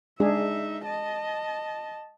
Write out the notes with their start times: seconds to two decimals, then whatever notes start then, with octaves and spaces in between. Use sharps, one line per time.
0.20 G#3 D4 D#4 G#4 E5
0.85 D#5 A5